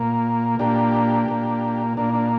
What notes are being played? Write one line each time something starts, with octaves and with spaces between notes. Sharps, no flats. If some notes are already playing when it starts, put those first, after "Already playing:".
Already playing: A#2 A#3
A#2 A#3 D4 G4
A#2 A#3
A#2 A#3 D4
D4